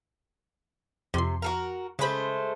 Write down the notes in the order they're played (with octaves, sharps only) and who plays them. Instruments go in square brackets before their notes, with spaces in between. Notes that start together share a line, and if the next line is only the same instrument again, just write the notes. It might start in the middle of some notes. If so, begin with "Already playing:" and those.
[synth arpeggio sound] F2 C6 [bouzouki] C3
[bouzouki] F#4 A4 A#4
[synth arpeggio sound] C#3 B5 [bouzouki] G#3 A3 C5